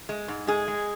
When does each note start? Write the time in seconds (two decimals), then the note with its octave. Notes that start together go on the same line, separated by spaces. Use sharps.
0.09 G#3
0.28 G#2
0.47 G#3 G#4
0.68 G#3